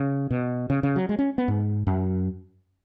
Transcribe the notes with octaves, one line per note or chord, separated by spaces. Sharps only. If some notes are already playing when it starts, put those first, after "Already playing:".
Already playing: C#3
B2
C#3
C#3
F#3
G#3
C#4
B3
G#2
F#2